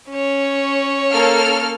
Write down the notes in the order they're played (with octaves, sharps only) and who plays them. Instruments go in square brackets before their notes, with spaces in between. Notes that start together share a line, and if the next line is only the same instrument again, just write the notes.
[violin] C#4 C#5
[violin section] A#3 A4 F6